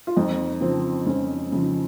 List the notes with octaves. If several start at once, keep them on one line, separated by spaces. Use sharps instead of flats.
F4
F2 D#4
C#3 F3 C4
F2 C#4
C#3 F3